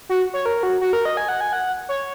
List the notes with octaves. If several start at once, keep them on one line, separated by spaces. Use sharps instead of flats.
F#4
C#5
A#4
F#4
F#4
A#4
D#5
G#5
F#5
G#5
F#5
C#5